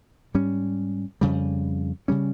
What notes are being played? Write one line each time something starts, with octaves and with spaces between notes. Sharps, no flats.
G#2 G3 C#4
F2 C#3 G3
C#3 G3 C#4